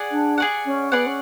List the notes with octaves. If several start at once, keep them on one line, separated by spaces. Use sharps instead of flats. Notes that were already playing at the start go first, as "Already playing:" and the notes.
Already playing: G#4 D5 F#5
D4
G#4 D5 F#5
C#4
B3 G#4 D5 F#5
C#4